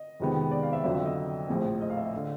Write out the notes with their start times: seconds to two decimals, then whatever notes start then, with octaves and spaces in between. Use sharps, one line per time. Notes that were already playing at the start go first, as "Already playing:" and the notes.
Already playing: D#5
0.20 F2 C3 D#3 G#3 B3
0.51 D5
0.63 F5
0.73 E5
0.84 F2 D3 F#3 E5
0.95 E5
1.06 D#5
1.48 A#1 A2 F3
1.81 D#5
1.90 F5
1.97 E5
2.14 D3 F5